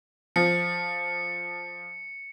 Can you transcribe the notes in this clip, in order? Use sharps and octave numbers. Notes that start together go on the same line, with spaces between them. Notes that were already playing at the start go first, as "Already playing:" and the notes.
F3 C#7